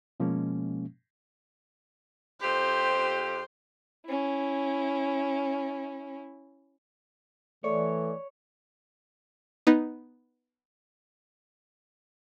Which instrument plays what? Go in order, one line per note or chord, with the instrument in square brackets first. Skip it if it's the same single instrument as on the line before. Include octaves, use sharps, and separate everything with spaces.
[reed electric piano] B2 F3 G#3 A#3 C#4
[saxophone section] F2 G4 [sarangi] C5
[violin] C#4 E4
[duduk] E3 [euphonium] A3 [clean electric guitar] C#5 [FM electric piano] D5
[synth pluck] B3 D#4